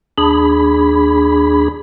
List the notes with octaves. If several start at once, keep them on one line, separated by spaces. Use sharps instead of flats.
D#2 D4 G#4 B5